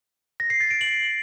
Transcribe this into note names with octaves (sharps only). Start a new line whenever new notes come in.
A#6
C7
A6
D7
F#7